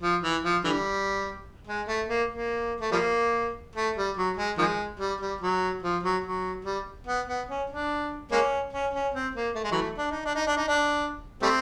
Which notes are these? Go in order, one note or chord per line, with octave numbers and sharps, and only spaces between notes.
F3
E3
F3
D3 E3 G3
G#3
A3
A#3
A#3
A3
F3 G3 A#3
A3
G3
F#3
G#3
D#3 F3 G#3
G3
G3
F#3
F3
F#3
F#3
G3
B3
B3
C#4
D4
G#3 A#3 C#4
C#4
C#4
C4
A#3
A3
G#3
E3 F#3 A3
D4
D#4
D4
D#4
D4
D#4
D4
G3 A3 C4